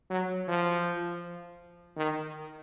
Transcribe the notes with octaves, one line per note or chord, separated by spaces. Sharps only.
F#3
F3
D#3